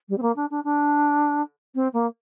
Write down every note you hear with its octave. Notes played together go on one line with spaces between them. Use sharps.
G3
C4
A#3
D4
D4
D4
C4
A#3